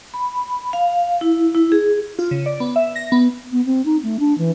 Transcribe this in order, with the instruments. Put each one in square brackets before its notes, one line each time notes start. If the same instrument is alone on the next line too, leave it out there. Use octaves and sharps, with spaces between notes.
[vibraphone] B5
F5
E4
E4
G#4
[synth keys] F4
C#3
D5
B3
E5
A#6
B3
[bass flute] B3
C4
D#4
A3
D4
E3